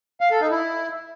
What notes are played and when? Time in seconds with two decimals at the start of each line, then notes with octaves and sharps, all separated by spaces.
0.21 F5
0.31 A4
0.41 D#4
0.51 E4